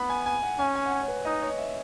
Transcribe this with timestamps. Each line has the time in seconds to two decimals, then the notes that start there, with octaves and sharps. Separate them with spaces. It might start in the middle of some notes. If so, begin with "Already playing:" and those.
Already playing: B3 B5
0.10 G#5
0.26 G#5
0.43 F#5
0.58 C#4 G#5
0.76 G#5
0.86 F#5
0.92 G#5
1.01 C#5
1.08 B4
1.25 D#4 D#5
1.42 C#5
1.58 E5